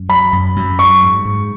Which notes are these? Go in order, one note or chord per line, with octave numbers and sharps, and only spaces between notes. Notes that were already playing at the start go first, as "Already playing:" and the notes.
Already playing: F#2
F#3 B5
F#2
F#2
F#3 C#6
G#2
G#2